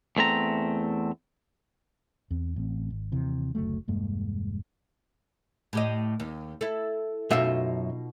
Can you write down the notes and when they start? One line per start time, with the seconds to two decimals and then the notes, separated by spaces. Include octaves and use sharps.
0.17 E2 A3 C4 A#5
2.31 E2 C4
2.56 A1 C4
2.90 G#1
3.12 D#2 C3 E3
3.55 F#1 D2 F#3 A3
3.88 E1 G2 G#3 A#3
5.73 A2 G4 D#5
6.20 D#2
6.61 E4 A4
7.31 F#2 B2 D#4 F4 E5